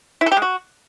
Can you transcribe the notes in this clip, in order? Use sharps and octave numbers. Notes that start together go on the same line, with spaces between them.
E4
A4
G4
G#3
F#4